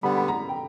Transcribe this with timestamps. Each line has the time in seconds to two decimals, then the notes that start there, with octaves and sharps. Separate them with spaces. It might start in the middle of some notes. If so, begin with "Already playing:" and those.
0.03 D3 G3 B3 B5
0.17 B5
0.28 A#5
0.49 G5